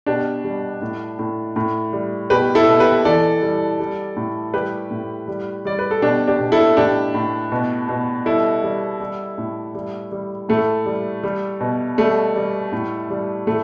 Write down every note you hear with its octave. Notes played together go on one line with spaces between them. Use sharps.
B2 D4 G4
G3
A2
A2
A2
G3
B2 G4 B4
E4 A4
B2
G4 B4
E3 A4 D5
G3
G3
A2
G3 G4 B4
A2
G3
G3 D5
B4
A4
B2 D4 G4
D4 G4
B2
E4 A4
A2 D4 G4
A2
B2
B2
G3 E4 A4
G3
G3
A2
G3
G3
A2 A3
G3
G3
B2
G3 A3
G3
A2
G3
A2 A3